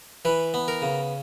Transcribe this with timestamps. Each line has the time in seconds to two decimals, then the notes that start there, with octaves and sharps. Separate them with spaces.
0.25 E3 B4
0.54 B3
0.68 A#4
0.82 C#3